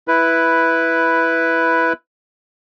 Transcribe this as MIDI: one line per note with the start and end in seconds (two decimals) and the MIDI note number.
0.08 1.93 64
0.08 1.93 71